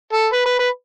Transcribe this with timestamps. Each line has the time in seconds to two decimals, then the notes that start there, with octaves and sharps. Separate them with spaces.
0.13 A4
0.33 B4
0.46 B4
0.59 B4